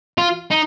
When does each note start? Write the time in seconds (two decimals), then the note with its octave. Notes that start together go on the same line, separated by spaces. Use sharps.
0.18 F4
0.51 D#4